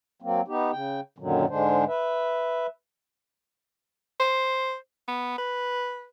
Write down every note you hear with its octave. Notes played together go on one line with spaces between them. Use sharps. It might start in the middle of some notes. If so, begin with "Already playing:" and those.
F#3 A#3 C4
B3 D#4 G4
C#3 G5
F#2 A#2 D3 D#3 F#3
G#2 D3 G#3 D4 C5
B4 E5
C5
B3
B4